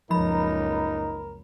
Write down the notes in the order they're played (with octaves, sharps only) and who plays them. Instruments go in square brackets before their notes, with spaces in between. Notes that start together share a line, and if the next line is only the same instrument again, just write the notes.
[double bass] F#1 C#2 [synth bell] F3 B5 [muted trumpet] D#4 [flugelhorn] A#4